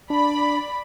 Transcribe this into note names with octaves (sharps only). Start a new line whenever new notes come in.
D4 D5 B5